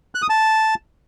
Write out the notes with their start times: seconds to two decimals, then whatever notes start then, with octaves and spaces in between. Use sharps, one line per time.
0.15 F#6
0.22 D#6
0.30 A5